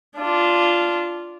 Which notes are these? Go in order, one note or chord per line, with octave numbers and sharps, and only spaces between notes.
D4 F4